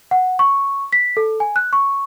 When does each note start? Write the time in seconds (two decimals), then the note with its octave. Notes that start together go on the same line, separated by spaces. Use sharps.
0.11 F#5
0.39 C#6
0.93 B6
1.17 A4
1.40 G#5
1.56 F#6
1.73 C#6